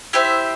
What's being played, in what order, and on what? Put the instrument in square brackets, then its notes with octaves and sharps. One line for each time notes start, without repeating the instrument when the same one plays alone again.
[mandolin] E4 G4 C5 E5